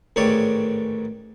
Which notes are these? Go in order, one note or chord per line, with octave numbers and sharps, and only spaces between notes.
A1 G#2 D#3 C#5 D5 E5